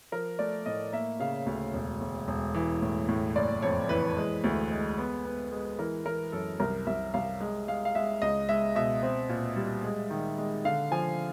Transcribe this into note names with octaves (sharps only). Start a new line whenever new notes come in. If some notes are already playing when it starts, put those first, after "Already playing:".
F3 A#4
A3 D5
A2 D#5
A#3 E5
C#3 F5
D2
E1
E1
E1
E3
A2
A2
F#1 D5
F2 C#5
E3 B4
G#3
D2
G#3
B3
B3
G#3
E3 A#4
E3 A#4
F#2 A4
C2 A#4
C2 E5
C2 F5
G#3
G#3 F5
F5
G#3 E5
C#2 D#5
G#3 E5
B2 E5
C4
A#2
G3
G#3
D#3
G#3
D3 F5
F3 G#5